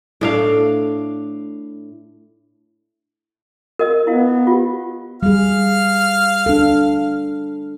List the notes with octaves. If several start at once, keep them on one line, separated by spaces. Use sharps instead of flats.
A2 A3 D4 F5
A#4 D#5 E6
B3 E4 F5
F4 G4
G3 G#4 F5 F6
D4 A4